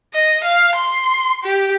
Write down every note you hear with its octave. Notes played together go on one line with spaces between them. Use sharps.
D#5
F5
C6
G4